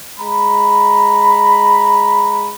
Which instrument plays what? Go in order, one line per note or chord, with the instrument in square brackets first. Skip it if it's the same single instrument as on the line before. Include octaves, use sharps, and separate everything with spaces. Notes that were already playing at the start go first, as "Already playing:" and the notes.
[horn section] G#3 A#5 B5